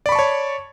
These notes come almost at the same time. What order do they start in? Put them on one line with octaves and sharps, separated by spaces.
D5 B5 C#6 A5 C#5